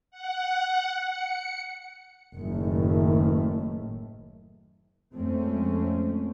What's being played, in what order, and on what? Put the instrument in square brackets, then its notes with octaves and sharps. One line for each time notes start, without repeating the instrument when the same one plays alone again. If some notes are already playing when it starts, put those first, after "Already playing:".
[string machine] F#5
C#7
[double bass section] F#1 F#2 A2 D#3 A3
F2 F3 G#3 A3 C4 C#4